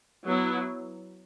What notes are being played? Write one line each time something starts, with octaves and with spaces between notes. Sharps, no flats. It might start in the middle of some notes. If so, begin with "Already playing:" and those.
F#3 B3 E4